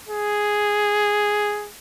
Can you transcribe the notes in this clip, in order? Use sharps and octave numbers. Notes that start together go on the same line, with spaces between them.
G#4